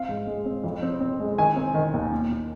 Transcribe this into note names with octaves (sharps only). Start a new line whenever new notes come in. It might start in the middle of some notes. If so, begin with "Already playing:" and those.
Already playing: C4 F5
G#2
G#3
C4
F2
C4
C4
G#3
D#3 G#5
C4
D#3
D#2
A#2
A#2